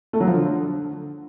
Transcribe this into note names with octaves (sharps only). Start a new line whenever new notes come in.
A3
F#3
F3
D3